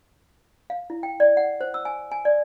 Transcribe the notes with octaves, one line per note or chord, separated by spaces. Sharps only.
F5
E4
G5
D5
F#5
C5
E6
G#5
G#5
D5